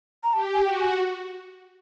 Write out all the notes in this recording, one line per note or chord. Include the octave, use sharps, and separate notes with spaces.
A#5
G4 A5
G#5
F#4 G5
G#5